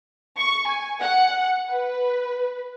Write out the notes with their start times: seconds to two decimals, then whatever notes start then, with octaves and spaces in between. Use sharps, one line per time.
0.38 C#6
0.67 G#5
1.00 F#5
1.72 B4